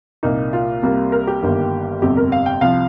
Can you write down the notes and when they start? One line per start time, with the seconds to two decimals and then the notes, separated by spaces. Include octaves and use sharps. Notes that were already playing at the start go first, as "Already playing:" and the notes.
0.23 C2 A#2 A#3 D#4
0.53 F4
0.83 C2 C3 G3 A#3
1.12 A#4
1.27 G4
1.42 G1 G2 D#3 G3 A#3
2.01 G1 F2 C3 G3 G4
2.17 A#4
2.32 F5
2.46 G5
2.61 C2 C3 F3 F5